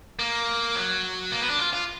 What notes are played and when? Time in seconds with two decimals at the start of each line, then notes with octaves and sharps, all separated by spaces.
0.19 A#3
0.75 F#3
1.32 A#3
1.41 B3
1.50 D4
1.59 F4
1.73 F4